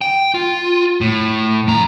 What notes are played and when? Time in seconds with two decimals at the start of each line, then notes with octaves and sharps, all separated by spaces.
0.01 G5
0.34 F4
1.01 A2
1.67 F2 A#5